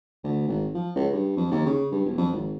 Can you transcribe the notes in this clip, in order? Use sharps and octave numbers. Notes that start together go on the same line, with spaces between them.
D2
G#1
F3
C#2
G2
F2
D#2
C#3
G2
E1
F2
G#1